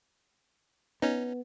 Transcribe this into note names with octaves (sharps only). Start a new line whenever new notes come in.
B3 C#4 D#4